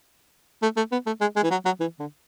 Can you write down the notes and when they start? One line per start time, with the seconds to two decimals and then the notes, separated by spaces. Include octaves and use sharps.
0.63 A3
0.77 A3
0.92 B3
1.06 A3
1.21 G#3
1.36 G#3
1.44 E3
1.51 F#3
1.65 F#3
1.80 E3
2.00 D3